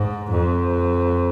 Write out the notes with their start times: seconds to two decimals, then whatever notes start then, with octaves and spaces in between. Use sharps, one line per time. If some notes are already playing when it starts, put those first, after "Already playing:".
Already playing: G#2
0.31 F2